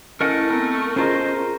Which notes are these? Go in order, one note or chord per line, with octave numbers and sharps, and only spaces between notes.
A3 C#4 E4 A#4 D#5 F#5
B3 C4 A#4
C#4 F4 G#4 A#4 C5 D#5 A#5